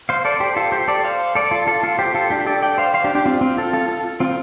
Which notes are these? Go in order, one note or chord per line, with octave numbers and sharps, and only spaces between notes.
C5 F5
A4 D5
G4 C5
F4 A4
G4 C5
A4 D5
C5 F5
A4 D5
F4 A4
F4 A4
F4 A4
G4 C5
F4 A4
D4 G4
A4 D5
D5 G5
C5 F5
C5 F5
D4 G4
D4 G4
C4 F4
C4 F4
F4 A4
F4 A4
F4 A4
C4 F4